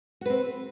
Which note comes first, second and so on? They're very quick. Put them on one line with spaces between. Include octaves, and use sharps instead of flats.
F#4 B4 C4